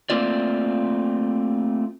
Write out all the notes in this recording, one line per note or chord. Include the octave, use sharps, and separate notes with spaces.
A3 A#3 C4 F4 D5